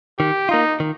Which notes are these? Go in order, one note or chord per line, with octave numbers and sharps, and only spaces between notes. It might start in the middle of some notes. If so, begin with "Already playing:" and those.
D#3 G4
A#3 D#4 F4
D#3